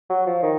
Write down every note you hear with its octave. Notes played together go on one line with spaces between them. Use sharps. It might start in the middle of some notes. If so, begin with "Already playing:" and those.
F#3
F3
D#3